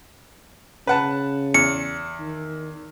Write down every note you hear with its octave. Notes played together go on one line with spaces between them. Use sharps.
C#3 B4 F#5 A5
E2 C#7
D#3